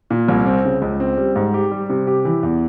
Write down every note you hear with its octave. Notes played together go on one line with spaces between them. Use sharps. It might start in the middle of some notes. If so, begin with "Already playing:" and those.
A#2
C2
C4
C#3
C#2
C4
G3
G#2
G4
G3
C3
G4
E3
E2